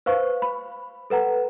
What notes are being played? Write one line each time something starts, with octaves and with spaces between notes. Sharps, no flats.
B4 C5 F5 C#6
B5
A4 B4 F#5 A#5